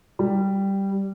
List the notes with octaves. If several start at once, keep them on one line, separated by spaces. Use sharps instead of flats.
G3